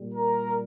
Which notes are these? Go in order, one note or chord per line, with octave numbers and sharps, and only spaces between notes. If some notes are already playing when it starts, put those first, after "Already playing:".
Already playing: A#2 G3
A#4